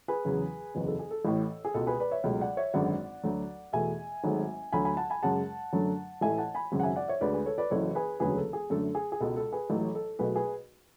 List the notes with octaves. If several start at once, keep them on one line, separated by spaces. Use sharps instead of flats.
G#4 B4
E2 C#3 F#3
F#1 E2 C#3 B4
A4
G#4
A4
A1 A2 E3
G#4
C#2 B2 G#3 A4
G#4 B4
B4 D5
C#5 E5
C#2 B2 F#3 A3
D5 F#5
C#5 E5
G#1 F#2 D3 G#3 D5 F#5
D2 D3 F#3 A3
E2 B2 A3 E5 G#5
G#1 G#2 F#3 A3
D2 D3 F#3 A3 G#5 B5
G#5 B5
F#5 A5
G#5 B5
F#2 C#3 G#3 F#5 A5
F#2 D3 F#3 A3
A1 A2 E3 A3 E5 G#5
F#5 A5
G#5 B5
G#1 F#2 C#3 F#3
F#5
E5 G#5
D5 F#5
C#5 E5
D2 D3 G#3 B4 D5
G#4 B4
A4 C#5
B4 D5
F#1 F#2 E3 A4 C#5
G#4 B4
E1 D2 C#3 F#3 G#4 B4
A4
G#4
F#2 D3 A3 A4
G#4
G#4
C#2 B2 G#3 A4
A4
G#4 B4
A1 A2 F#3 A3 A4
A4
B1 B2 A3 G#4 B4
G#4 B4